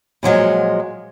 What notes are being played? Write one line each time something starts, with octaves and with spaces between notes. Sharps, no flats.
A#2 F3 F#3 G#3